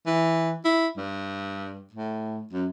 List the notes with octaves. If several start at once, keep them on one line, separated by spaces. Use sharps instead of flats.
E3
E4
G2
A2
F#2